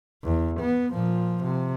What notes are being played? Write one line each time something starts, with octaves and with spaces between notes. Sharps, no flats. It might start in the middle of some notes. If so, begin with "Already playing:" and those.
E2
B3
A#2 F3
C3